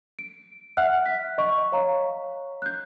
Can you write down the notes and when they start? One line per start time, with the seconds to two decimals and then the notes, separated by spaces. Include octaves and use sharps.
0.19 D7
0.77 E5 F#5 F6 F#6
1.06 B6
1.38 D#5 C#6
1.72 C#5 F5 A#5
2.62 F#6 G6